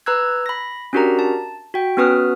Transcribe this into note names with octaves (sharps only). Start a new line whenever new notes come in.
B4 A#5 E6 F#6 G#6
B5 A#6
C#4 D4 F#4 G4 A#4 A#5
A5
F#4 G5
B3 C#4 F#4 B4 D#6 F6